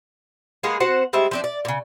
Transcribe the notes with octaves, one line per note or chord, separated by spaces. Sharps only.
G#3 A#3 B3 G#4
C4 F#4 C5 F#5
G3 G#3 C4 E5
F3 C4 D4
D5
A#2 C#3